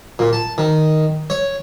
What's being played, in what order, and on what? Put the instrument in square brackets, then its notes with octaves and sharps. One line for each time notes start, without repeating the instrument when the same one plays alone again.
[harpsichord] A#2
A5
D#3
C#5